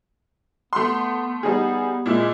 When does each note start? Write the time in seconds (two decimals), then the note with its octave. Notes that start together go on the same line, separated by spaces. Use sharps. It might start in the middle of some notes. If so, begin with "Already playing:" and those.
0.73 A3 B3 C6
1.43 G3 B3 D#4 G#4
2.06 A#2 G#3 E4